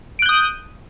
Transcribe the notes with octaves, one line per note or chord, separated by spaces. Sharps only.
D#6 F#6 G6 D7